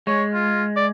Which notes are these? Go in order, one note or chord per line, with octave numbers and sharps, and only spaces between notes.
G#3 C#5
F4
D5